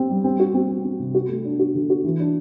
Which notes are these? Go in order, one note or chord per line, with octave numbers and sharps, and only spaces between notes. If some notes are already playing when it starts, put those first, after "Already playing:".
Already playing: C4 G4
G3
C4
F#4
C4
C4
C4
C3
F#4
A3
D4
F#4
D3
F#4
E3
D4